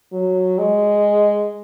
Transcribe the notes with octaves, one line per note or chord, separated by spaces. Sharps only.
F#3
G#3